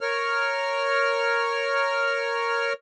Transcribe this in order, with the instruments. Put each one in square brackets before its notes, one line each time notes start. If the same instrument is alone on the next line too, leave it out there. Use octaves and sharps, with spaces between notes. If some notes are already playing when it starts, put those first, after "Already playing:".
[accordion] A#4 C#5 F6